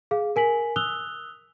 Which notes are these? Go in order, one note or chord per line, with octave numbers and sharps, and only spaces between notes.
G#4 F5
A#4 G#5 B6 F#7
D#6 E6 F#6 F7 G7